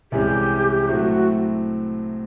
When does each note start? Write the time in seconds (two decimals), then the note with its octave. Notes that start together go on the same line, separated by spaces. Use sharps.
0.12 C2 C3 E3 G#3 C#4 G4
0.89 A2 F#3 A3 C4 E4 F#4